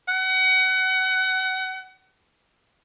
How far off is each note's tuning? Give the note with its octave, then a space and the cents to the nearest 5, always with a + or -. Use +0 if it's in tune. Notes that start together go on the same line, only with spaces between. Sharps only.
F#5 +30